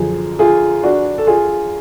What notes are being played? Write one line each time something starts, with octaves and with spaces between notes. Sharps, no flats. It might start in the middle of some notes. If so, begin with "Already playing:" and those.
Already playing: F#2 D3 F3 G#4
F4 G#4
D4 F#4
A4
F4 G#4